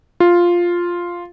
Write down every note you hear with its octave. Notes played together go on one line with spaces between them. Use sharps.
F4